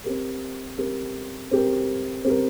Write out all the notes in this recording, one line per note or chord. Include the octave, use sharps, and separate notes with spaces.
C4 G4 A#4
C4 G4 A#4
C4 G4 A#4
C4 G4 A#4